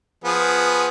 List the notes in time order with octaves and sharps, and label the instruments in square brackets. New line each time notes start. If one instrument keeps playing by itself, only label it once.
[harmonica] F3 B3 G#4